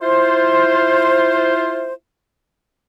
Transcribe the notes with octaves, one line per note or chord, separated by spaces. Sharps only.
E4 F4 C5